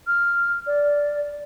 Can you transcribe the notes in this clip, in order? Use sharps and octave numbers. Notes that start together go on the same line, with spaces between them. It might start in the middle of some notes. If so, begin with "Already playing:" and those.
F6
D5